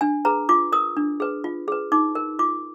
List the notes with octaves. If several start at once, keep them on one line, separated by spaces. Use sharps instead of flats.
D4 G#5
G#4 B4 A#5
F4 D6
A#4 D#6
D4
G#4 B4
F4
G#4 B4
D#4 D6
A#4
F4 D6